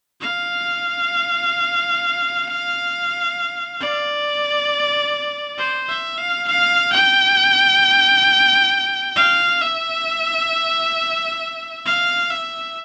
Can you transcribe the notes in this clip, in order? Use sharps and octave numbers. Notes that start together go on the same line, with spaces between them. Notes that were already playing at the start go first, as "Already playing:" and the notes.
F5
D5
C5
E5
F5
F5
G5
F5
E5
F5
E5